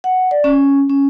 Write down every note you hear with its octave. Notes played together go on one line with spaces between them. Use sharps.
F#5
D5
C#4
C#4